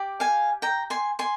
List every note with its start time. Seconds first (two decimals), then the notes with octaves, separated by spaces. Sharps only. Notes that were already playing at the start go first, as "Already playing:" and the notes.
Already playing: G4 D5
0.20 F5 G#5
0.62 G5 A#5
0.90 G#5 C6
1.19 G#5 C6